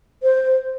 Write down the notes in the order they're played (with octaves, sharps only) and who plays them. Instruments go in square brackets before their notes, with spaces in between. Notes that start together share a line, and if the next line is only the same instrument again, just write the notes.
[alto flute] C5